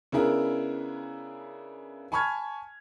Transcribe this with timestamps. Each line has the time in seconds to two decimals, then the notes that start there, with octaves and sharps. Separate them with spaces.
0.12 C#3 B3 D4 E4 G#4 A#4
2.12 G#5 A5 B5 C#6 F6 G#6